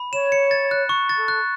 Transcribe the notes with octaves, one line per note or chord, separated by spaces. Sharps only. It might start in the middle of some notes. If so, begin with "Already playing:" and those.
Already playing: B5
C#5 E7
C#7
A6
F#6
C#6
A6
A4
F#6